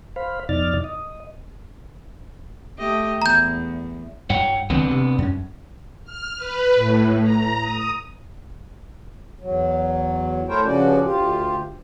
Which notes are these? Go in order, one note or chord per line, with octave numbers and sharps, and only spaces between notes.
C5 F5 B5
F2 B2 D#4 D5 F6 A6
D#5
A3 G4 D#5
E2 A#5 G6
G2 C#5 F#5 G5
C#2 D#3 F#3 B3 C4 D4
C3
F#2 C#4
F6
B4
A2
A#5
D#6
E2 F#3
A3 E4 A#4 C5 C#5 G5
G2 C#3 F3 C#4 F#4 D5
D2 F4 G4